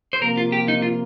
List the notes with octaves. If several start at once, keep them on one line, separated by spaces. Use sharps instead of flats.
C5
C3 F3 A#3 A#4
F4
G4
D#4
F4